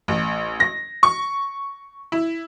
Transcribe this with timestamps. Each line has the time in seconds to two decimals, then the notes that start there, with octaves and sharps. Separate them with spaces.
0.08 A1
0.60 A#6
1.03 C#6
2.12 E4